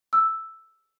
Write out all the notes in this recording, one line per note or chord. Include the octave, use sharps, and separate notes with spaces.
E6